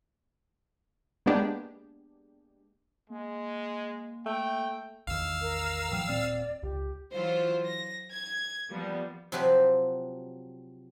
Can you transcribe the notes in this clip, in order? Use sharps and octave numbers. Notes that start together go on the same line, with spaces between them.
G#3 A#3 B3 D4 G4 G#4
G#3 A#3
A3 G5
A1 E2 D#3 F5 E6
A#4
A2 E3 F#3 G5
D#1 A#2 C4 D5
C#2 G4
E3 F#3 F4 C5
A#6
G#6
F3 G3 A#3 B3
C3 F3 F#3 F#4 G4 B4